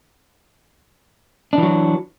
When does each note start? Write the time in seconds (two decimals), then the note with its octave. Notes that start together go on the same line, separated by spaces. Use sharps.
1.53 D4
1.58 E3
1.63 F#3